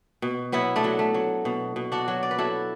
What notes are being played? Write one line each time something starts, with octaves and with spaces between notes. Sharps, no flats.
B2
F#3 B3 E4
A3 D4
F#3
A3
F#3
B2
B2
D4 F#4
F#3
D5
B4
F#3 E4 A4